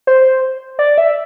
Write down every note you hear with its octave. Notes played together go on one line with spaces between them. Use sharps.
C5
D5
E5